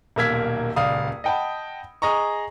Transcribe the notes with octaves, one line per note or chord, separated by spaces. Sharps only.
D#1 B1 A#3 E6 G#6 B6
D#1 C#2 D5 F5 D#6
D#5 F#5 G5 A5 B5
G#4 D#5 A#5 C#6